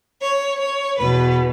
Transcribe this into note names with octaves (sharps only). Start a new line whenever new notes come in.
C#5
C#5
E2 B2 B4